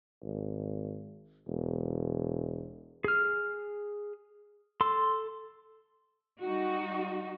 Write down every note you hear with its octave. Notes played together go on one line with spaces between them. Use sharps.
G#1
E1
G#4 F6
A4 C6
G3 D#4 F#4